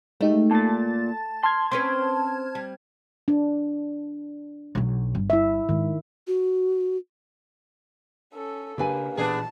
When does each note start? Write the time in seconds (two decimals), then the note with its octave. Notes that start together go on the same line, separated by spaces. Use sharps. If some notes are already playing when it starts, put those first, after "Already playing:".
0.21 G#3 A3 D#4 G4
0.51 A#2 A5 A6
1.43 A5 C6 F6 G#6
1.72 C4 C#4 B4 C6
2.55 G3
3.28 D4
4.75 B1 F#3
5.15 G1
5.30 E4 E5
5.69 G#2 D#3
6.27 F#4
8.33 C#4 A4
8.78 C#3 A#3 D4 G4 B4 G#5
9.17 A1 A#2 E3 B3 D4 G#4 A5